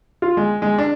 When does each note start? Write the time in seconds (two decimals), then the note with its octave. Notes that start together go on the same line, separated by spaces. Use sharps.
0.22 F4
0.37 G#3
0.62 G#3
0.78 D4